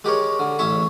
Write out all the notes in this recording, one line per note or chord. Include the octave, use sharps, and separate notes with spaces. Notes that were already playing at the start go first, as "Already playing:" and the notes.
G#3 G4 A#4 C#5
D3
A1 C#4 C#5 E5 C#6